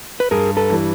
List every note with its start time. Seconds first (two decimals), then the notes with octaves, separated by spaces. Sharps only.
0.20 B4
0.31 G2 G#4 A#4
0.57 A4 B4
0.70 E3 G3